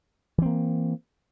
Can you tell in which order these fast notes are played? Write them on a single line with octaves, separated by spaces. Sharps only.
E3 C4 A#3